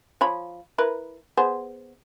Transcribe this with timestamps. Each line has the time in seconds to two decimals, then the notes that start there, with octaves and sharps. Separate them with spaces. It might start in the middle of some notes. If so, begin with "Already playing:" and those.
0.21 F3 C#5 B5
0.78 E4 A#4 B4
1.37 B3 G#4 C5